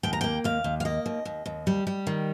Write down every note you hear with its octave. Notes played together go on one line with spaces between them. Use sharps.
D#2 G5
A#5
A#3 G5
D#2 F5
D#2
F5
A#3 D#5
D#2
D#2
D#2
G3
G3
D#3